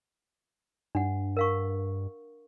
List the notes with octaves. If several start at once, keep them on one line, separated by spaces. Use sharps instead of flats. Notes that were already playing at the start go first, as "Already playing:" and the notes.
G2 D4 F#5
A#4 F5 C#6